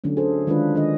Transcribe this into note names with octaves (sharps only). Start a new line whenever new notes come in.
D3 F#3 A3 C#4
G#4 A4 C5
D#3 G#3 D4 F4 B4
D#3 D4 G#4 D#5